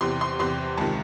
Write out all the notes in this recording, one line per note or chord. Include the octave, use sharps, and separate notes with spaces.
E2 C3 E3 C6
C6
E2 C3 E3 C6
C#2 C3 D#3 A5